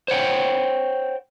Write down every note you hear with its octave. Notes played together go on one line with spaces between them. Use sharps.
C5 C#5 F#5 G5